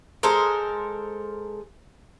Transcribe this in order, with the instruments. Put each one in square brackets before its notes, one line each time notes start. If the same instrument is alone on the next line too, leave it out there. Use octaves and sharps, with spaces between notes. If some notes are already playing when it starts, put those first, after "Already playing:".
[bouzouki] G#3 A4 A#4 C5